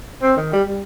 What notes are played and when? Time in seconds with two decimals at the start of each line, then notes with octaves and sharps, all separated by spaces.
0.22 C4
0.37 D#3
0.53 G3
0.68 G3